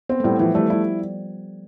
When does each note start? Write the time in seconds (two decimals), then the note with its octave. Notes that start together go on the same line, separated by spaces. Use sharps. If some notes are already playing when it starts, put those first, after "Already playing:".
0.09 B3 C4
0.20 A3
0.24 A2 G3
0.39 E3 F3
0.55 G3 A3
0.70 G3 E4